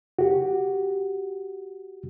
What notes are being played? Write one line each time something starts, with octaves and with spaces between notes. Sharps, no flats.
F#4 G4